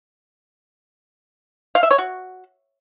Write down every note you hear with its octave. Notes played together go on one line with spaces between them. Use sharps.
F5
E5
C#5
F#4